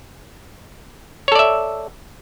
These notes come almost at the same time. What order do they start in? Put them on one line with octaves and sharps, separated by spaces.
C#5 A4 D5 E5